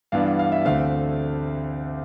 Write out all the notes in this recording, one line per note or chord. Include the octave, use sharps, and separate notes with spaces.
G2 E3 B3 D4 F5
F5
E5
D2 D3 A3 C4 F5